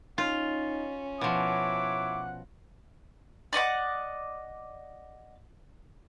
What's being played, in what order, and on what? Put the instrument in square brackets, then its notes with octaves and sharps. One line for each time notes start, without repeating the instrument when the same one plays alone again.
[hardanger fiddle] C#4 [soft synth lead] D#4 [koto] F4
[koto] B2 F3 [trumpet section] E4 C#5 D6 [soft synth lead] F#5
[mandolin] D5 D#5 F#5 D6